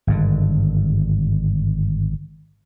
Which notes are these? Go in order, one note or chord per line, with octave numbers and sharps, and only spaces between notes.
G#1 G2 D3